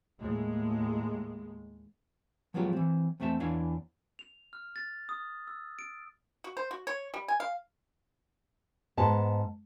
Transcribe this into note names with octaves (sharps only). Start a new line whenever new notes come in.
D#2 A2 G#3
F3 F#3 G#3 B3 F4 G4
E3 C4
E2 A3 C4 E5 A5
E2 E3 D4 C#5 F5
F7
F6
A6
D#6
E6
D7
F#4
C5
F#4
C#5
G3
G#5
F5
G#2 B3 A5